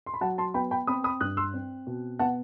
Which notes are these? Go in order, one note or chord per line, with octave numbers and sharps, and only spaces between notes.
C6
B5
F#3 F#5 A5
A5 C6
B3 G5 B5
G5 B5
C4 B5 D#6
B5 D#6
G2 D#6 F#6
C6 E6
C4
B2
B3 F#5 A5